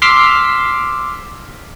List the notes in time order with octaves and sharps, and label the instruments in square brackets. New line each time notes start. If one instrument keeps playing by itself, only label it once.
[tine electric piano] C6 D6 E6 F6 B6 C7